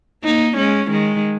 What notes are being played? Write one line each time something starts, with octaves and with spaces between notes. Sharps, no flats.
A#3 D#4
G#3 C#4
D#3 G#3